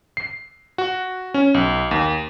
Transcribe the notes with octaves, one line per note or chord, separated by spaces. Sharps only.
C7
F#4
C#4
B1
D#2